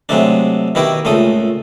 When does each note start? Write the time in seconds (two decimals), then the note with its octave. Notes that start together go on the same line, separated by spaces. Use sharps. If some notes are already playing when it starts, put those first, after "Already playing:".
0.09 C3 F#3 G#3 A3 D4
0.75 B2 D#3 E4 F#4 G4
1.05 C#2 A#2 A3 A4 D#6